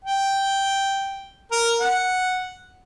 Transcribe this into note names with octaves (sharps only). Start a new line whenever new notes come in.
G5
A#4
F#5